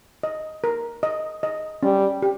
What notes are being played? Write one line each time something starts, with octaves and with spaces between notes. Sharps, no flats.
D#5
A#4
D#5
D#5
G3 C#4
G4